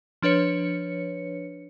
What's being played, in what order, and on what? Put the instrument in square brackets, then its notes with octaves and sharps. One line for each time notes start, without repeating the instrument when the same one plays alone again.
[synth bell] F3 D4 B4 C#5 C#7